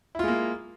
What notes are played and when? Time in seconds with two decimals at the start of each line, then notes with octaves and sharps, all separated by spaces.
0.15 E4
0.19 F4
0.24 G#3
0.28 A#3